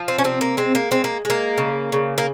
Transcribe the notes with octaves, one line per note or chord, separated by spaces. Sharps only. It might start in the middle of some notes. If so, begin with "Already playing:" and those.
Already playing: F3
C4
C#4
C3 C4
A#3
G#3 C4
A#3
G#3 C4
A#3
G#3 A#3
C#3
C#3
A#3